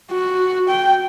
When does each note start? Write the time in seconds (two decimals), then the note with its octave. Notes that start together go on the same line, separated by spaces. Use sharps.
0.11 F#4
0.69 G5